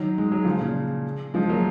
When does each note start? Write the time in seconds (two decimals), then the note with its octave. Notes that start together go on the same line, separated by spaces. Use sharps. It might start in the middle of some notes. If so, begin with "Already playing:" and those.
Already playing: D#3 F#3
0.18 G#3
0.32 F#3
0.45 C#3 F3
0.60 A#2 C#3
1.34 F3 G#3
1.49 F#3 A#3